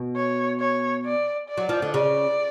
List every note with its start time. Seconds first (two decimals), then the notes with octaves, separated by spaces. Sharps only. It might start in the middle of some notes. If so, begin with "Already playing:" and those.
Already playing: B2
0.16 C#5
0.60 C#5
1.05 D5
1.49 D5
1.57 F#3
1.69 F3
1.82 D3
1.94 C#3 D5